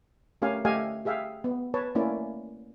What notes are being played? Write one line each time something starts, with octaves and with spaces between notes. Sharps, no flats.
A3 C#4 G4 A#4 F5 G#5
A3 G4 D#5 F5 G#5
G4 G#4 E5 F5 G5
B3
B4 C#5 A5
A3 A#3 C#4 E4 D5